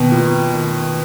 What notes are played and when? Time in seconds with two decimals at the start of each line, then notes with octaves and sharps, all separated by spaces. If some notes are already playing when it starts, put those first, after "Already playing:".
Already playing: B2 D#3 A#3
0.11 A#3 F4
0.54 D#3